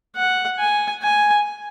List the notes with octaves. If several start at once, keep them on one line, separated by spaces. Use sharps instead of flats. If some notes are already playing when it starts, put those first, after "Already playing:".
F#5
G#5
G#5